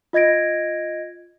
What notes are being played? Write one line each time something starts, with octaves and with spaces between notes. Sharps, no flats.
F4 D#5 G#6 A#6 D7